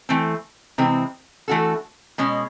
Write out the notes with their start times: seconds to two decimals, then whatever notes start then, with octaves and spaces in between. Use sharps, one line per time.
0.09 E3 A3 C4
0.78 C3 E3 G#3 C4
1.48 E3 A3 D4 F#4 A4
2.18 B2 G#3 C#4